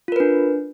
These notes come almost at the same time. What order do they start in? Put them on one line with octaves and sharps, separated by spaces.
F4 A#4 B4 D4